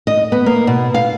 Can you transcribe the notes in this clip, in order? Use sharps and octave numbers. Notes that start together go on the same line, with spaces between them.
D#5
B3
A#3
B2
F5